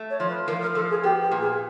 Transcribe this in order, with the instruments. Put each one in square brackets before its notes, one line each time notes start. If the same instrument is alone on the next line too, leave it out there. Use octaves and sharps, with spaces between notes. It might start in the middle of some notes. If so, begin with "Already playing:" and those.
Already playing: [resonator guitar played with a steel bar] A3
[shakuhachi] C#5
[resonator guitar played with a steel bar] F3
[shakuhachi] B4
[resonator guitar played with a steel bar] F3 [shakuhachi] A#4
[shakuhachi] A#4
[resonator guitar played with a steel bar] F3 [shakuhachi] A4
[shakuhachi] G#4
[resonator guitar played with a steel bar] B3 [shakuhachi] G4
[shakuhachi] G4
[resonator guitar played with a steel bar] A#2
[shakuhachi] G#4